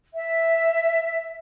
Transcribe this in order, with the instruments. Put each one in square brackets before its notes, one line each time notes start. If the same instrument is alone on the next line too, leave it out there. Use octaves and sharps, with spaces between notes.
[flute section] E5